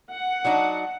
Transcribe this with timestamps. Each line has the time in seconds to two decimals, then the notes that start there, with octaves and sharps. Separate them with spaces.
0.13 F#5
0.45 F#3 D4 D#4